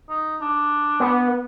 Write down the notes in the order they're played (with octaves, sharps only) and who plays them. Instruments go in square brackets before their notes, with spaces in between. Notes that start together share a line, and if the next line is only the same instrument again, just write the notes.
[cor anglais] D#4
D4
[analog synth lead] B3